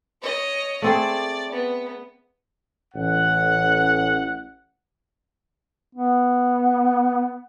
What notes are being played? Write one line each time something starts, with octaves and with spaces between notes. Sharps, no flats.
C#5 D#5
A3 C4 G#4 D5
B3
A1 F#5
B3